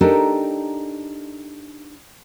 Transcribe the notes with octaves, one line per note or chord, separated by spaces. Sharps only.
D4 D#4 G4 A4 A#4